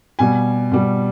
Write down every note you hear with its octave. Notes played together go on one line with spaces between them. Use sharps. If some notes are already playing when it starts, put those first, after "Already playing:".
B2 G3 G#5
B2 G3